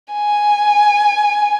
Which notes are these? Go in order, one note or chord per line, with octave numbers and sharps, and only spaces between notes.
G#5